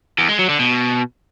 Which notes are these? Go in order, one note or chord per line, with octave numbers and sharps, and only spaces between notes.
E2
G#3
F#3
D3
B2